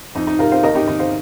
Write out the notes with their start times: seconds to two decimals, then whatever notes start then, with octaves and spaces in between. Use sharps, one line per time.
0.15 F2 D#4
0.27 D#4
0.39 C3 F4 A#4
0.52 C5 F5
0.63 D#2 A#4 D#5
0.75 D#4 G4
0.88 D#3 D#4
0.99 C5 F5